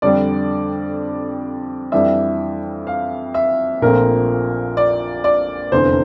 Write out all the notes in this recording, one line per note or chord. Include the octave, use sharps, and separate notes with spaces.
F2 D3 G3 D4 D5
F2 E3 G3 D4 E5
F5
E5
A#1 A#2 F3 A3 C4 A#4
D5
D5
F1 E2 D3 C5